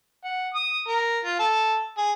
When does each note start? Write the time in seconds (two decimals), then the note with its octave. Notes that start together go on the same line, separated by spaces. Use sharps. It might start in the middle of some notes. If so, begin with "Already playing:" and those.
0.24 F#5
0.54 D#6
0.88 A#4
1.25 F4
1.39 A4
1.97 G#4